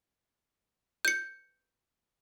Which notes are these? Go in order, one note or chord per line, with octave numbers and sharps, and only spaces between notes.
G6 C#7